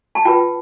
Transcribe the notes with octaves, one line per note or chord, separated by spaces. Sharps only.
A5
F4 B4 G5